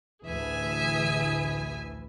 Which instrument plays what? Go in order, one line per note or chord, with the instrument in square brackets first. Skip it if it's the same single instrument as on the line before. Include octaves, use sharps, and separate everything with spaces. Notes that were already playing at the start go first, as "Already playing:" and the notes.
[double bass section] A1 D2 E3 [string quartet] G#4 E5 G#5